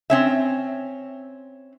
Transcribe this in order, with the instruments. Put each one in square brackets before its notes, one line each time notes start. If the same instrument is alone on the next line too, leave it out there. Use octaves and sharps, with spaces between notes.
[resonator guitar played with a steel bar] C4 C#4 E5